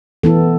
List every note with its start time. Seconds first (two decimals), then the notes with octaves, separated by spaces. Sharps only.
0.23 E3 B3 E4 A4